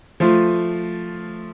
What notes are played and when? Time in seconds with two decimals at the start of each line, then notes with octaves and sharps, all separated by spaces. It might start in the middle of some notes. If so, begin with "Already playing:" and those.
0.20 F3 A3 F4